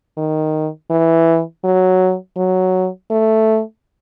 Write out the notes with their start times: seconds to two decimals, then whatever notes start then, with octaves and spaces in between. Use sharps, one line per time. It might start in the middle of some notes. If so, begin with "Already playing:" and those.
0.18 D#3
0.91 E3
1.65 F#3
2.37 F#3
3.11 A3